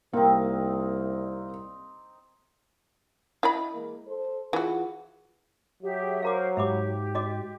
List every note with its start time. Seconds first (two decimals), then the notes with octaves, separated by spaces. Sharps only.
0.13 C2 A#3 C4 D#4
3.43 E4 D#5 B5
3.72 E3 G#3 A#3
4.07 A4 C5
4.53 E3 F4 F#4 G#4
5.82 F#3 G4 G#4 E5
6.22 A#4 C5 F5 A#5 D6
6.57 G#2 G4 E5 B5 D6
7.15 F#4 D#5 D6